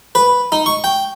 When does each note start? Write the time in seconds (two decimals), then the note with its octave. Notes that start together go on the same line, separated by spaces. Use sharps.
0.15 B4
0.52 D#4
0.66 C#6
0.84 G5